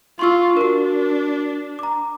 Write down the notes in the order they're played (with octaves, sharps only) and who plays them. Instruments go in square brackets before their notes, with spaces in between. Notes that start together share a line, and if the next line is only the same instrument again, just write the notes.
[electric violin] F4 [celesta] C6 C#6 E6
[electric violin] D4 [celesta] F#4 A#4
[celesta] A#5 D6